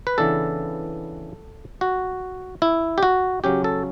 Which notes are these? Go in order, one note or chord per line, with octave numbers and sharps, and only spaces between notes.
B4
C#3 E3 B3 D4 A4
F#4
E4
G4
F#4
C#3 F#3 C#4 G4
A4